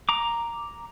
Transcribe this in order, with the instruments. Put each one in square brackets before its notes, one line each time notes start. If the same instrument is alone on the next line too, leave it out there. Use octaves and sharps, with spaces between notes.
[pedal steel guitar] A#5 D6